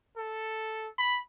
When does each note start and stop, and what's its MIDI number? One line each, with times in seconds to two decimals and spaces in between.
0.17 0.88 69
0.98 1.19 83